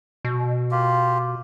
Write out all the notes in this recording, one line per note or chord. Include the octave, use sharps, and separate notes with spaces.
B2
A#3 F4 G4